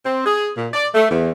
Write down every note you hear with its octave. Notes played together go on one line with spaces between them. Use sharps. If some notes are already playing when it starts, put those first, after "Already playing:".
C4
G#4
A#2
D5
A3
E2